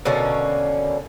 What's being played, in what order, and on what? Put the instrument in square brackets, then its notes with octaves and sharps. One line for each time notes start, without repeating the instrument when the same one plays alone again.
[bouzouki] B2 D3 A#3 C#4